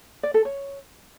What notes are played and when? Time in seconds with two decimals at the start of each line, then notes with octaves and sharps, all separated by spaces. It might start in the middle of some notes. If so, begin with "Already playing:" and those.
0.23 D5
0.34 A4
0.45 C#5